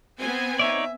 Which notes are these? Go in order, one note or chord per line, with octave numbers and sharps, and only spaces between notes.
B3 C4 G#5
D#4 C#5 D5 E5